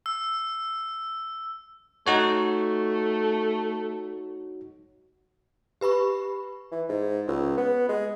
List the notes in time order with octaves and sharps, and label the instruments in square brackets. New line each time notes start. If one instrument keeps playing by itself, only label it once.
[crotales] E6
[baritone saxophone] A3 [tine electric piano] D#4 F#4 C#5
[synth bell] G4 B4 B5 C#6
[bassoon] E3
G#2
C#2
B3
G#3